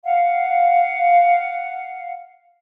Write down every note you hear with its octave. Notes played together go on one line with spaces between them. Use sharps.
F5 F#5